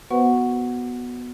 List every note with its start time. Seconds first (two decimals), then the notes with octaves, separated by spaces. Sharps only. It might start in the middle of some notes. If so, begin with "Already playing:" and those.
0.10 B3 F#4 B4 C5 F#5 C#6